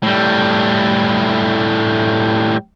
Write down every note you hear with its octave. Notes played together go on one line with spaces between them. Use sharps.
A2 G3